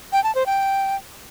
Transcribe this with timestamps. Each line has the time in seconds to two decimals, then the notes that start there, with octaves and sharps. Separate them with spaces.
0.13 G5
0.24 A5
0.35 C5
0.46 G5